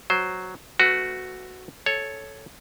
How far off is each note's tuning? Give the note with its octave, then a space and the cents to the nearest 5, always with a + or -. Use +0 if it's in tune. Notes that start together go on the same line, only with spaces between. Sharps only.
F#3 +0 C5 +0
A3 +0 F#4 +0 B4 +30
A4 -10 C#5 +0